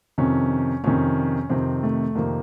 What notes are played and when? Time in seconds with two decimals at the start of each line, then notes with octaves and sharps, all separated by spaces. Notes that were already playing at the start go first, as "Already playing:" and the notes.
0.18 F2 C3 D#3 C#4
0.84 F2 C3 D#3 C#4
1.49 F2 C3 D#3 C4
1.83 A3
2.15 F2 C3 D#3 A#3